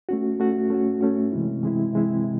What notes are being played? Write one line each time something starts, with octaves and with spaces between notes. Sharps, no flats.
A3 C#4 F#4
A3 C#4 F#4
A3 C#4 F#4
A3 C#4 F#4
C3 E3 G#3 C4 E4
C3 E3 G#3 C4 E4
C3 E3 G#3 C4 E4
C3